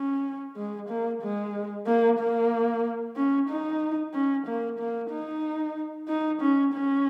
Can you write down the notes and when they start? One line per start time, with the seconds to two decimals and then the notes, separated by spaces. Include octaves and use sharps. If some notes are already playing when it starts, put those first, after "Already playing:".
Already playing: C#4
0.57 G#3
0.89 A#3
1.22 G#3
1.87 A#3
2.19 A#3
3.16 C#4
3.49 D#4
4.14 C#4
4.46 A#3
4.79 A#3
5.11 D#4
6.08 D#4
6.41 C#4
6.74 C#4